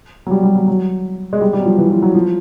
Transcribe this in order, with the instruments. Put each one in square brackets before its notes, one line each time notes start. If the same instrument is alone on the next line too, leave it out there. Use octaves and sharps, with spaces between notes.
[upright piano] F#3
G3
G3
F#3
F#3
G#3
G3
G3
F#3
F3
E3
F3
F#3
F3